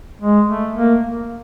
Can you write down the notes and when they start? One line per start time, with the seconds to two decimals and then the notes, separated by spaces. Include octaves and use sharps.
0.22 G#3
0.48 A3
0.76 A#3